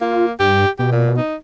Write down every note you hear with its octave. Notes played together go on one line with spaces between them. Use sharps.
A#3 F4
G2 G4
B2 G4
A#2
D#4